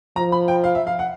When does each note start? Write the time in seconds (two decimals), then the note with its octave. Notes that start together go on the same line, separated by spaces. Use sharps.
0.16 F3 A#5
0.32 B5
0.48 G5
0.64 F5
0.75 E5
0.87 F5
0.99 F#5